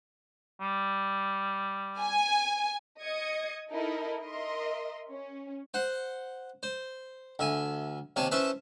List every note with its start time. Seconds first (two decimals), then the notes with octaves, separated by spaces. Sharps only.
0.61 G3
2.00 G#5
3.02 D#5 D#6 G#6 C#7
3.70 D#4 E4 A4 A#4 D#5
4.23 A#4 D#5 E5 C6
5.12 C#4
5.74 C5 F#5
6.63 C5
7.39 D2 E5 G#5
8.16 D#2 C3 C#5 G#5 A5
8.31 C#4 E4 B4 C5 E5 A5